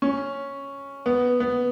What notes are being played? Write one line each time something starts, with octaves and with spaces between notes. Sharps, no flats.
C#4
B3
B3